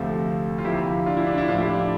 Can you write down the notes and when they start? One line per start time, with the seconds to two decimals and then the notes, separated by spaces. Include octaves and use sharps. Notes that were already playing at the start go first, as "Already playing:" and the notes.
Already playing: D2 C3 F3 A3
0.58 F4
0.64 D2 C3 F3 A#3 E4 G4
1.06 D4 F4
1.17 E4
1.27 D4
1.38 E4
1.48 A2 F3 A3 D4 F4
1.58 E4 G4
1.68 D4 F4
1.79 D4